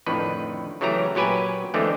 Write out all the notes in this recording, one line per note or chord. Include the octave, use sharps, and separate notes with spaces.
F2 A2 D3 D#3 B4
C#3 E3 F#3 A3 G4 A#5
A#2 F#3 G4 B4 G#5
D3 E3 G#3 A3 C4